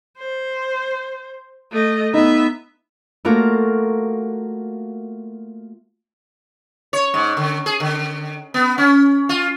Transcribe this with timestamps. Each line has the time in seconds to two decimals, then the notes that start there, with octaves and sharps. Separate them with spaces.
0.18 C5
1.72 A3 D#5
2.14 B3 D#4 E5
3.25 A3 A#3 F4 F#4 A#4
6.93 C#5
7.14 G#2
7.37 D3
7.66 G#4
7.80 D3
8.54 B3
8.78 C#4
9.29 F4